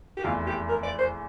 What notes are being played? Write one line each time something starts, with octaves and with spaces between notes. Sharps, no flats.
G4
F1 E2 E3 F4
G4
A#4
D5
C5